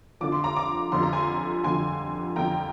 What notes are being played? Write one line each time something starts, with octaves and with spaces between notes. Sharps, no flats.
F2 D3 F3 D6
C6
A#5 D6
A#5 D6
F2 D3 F3 C6
A#5
G#5 C6
F2 D3 F3 G#5 C6
F2 D3 F3 G5 A#5